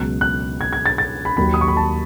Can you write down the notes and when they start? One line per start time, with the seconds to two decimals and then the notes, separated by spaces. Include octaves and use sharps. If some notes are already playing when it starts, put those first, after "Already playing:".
Already playing: C#2 B2 F#3 F#6
0.21 F#6
0.61 G#6
0.73 G#6
0.86 A6
0.98 A6
1.25 B5
1.37 D#2 D#3 F#3 B5
1.54 D#6
1.61 C#6
1.68 B5
1.77 A5